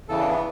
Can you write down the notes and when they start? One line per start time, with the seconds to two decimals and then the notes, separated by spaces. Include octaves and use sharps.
0.08 E2 C#3 E3 A4
0.19 D4
0.30 B3